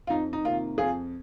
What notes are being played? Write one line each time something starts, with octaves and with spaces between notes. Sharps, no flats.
F4
F2 D#4
D#4
C3 D#3 A#3 F4
F2 F4 G#4